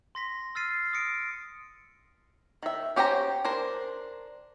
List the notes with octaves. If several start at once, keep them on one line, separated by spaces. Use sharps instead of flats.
C6 A#6 B6
E6 F6 A6 C7 D#7
D#6 A#6 C#7 D7
D#3 E5
C#4 G4 C5 G5 A#5
D4 A#4 C5